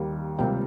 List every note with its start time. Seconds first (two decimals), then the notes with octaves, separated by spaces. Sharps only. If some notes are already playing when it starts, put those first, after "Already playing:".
Already playing: D#2 D#3 G3 A#3
0.39 C#2 C3 G3 A#3 G5